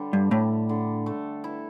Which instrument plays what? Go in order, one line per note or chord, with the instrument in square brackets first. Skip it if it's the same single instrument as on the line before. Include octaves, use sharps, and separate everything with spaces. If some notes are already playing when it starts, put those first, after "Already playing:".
Already playing: [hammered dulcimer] D3 G3
[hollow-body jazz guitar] G2
[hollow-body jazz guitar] A2 [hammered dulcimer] G3
[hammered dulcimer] D3
A3
E4